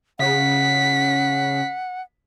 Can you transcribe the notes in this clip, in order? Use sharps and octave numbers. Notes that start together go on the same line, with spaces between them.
C#3 F#5 B6